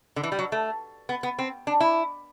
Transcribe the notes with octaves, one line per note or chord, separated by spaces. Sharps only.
D3
E3
G3
F#3
A3
B3
B3
C4
D4
E4